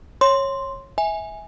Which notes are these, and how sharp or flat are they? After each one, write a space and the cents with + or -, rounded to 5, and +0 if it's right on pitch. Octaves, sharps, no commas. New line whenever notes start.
C#5 -15 C6 +0
E5 -20 G#5 +0